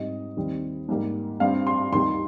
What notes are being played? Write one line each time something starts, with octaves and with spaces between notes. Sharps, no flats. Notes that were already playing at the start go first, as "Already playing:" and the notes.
Already playing: G#2 G3 C4 D#5
D#2 D#3 G3 C4
G#2 G3 A#3
G2 G3 C4 F5
C6
D#2 D#3 G3 C6